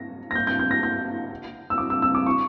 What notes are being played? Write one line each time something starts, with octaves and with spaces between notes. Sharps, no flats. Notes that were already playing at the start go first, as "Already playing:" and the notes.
Already playing: A#6
A#6
G6
G6
G6
A#6
G6
E6
D6
E6
E6
D6
C#6